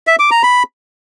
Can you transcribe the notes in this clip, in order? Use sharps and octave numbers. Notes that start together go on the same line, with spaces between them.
E5
D6
A#5
B5